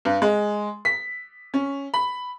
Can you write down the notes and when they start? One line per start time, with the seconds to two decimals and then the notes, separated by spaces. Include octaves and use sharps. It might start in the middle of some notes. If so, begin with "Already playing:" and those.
0.05 G2
0.22 G#3
0.85 B6
1.54 C#4
1.94 B5